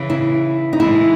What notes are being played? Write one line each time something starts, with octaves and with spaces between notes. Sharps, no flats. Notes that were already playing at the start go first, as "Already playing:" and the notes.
Already playing: C#3 E3
E4
D#4
E3 G#3 E4